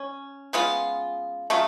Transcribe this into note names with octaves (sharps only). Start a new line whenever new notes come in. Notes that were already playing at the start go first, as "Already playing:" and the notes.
Already playing: C#4
C#3 G#3 B3 F4
C#3 F#3 A3 F4